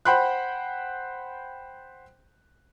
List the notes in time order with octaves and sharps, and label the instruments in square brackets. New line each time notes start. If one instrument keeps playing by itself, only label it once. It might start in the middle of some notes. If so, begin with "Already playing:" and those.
[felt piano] C5 F#5 G5 B5 C6 F#6